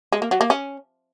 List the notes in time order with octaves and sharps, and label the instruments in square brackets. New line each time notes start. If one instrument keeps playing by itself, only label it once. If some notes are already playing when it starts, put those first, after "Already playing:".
[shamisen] G#3
A#3
F#3
A#3
C#4